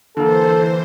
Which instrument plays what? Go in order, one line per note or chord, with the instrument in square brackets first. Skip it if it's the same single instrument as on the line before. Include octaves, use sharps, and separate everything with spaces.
[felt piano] D3 A#3 [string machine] E3 C5 [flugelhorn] A4